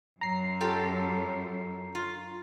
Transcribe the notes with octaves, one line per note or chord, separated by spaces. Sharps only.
F#2 A#5 C7
F4 G4 A4
F4